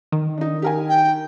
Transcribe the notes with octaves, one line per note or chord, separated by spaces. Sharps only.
D#3
D4 D#4
G4 A#4 G#5
G5